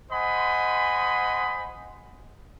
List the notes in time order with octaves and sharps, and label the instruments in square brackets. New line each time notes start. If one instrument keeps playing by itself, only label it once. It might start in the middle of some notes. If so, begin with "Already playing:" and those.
[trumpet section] C5 D#5 F#5 G#5 B5 C6